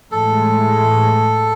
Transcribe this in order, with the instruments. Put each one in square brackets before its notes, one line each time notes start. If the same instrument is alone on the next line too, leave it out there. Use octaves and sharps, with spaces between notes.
[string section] A2 E3 G#3 [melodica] A4